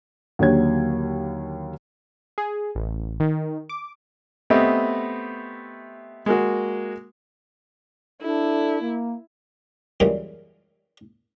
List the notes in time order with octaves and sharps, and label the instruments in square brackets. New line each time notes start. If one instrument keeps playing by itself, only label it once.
[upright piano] D#2 D3 F#3 G4 C#5 G#6
[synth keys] G#4
A1
D#3
D6
[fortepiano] A3 B3 C4 G4 D#5 E5
G#3 A#3 F#4
[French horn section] D4 A4 [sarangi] E4
[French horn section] A#3
[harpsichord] F#2 A#2 C#3 E3 G3 G#3